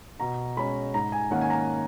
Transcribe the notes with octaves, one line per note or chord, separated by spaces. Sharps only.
B2 A#5
G#3 C#4 B5
G#2 A#5
G#5
D#3 A#3 C#4 F#5
G#5
A#5